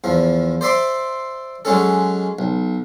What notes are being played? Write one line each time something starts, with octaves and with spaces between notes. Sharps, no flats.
E2 F3
C5 D5 E5 C6 D6
F#3 G#3 C#4 A4
B1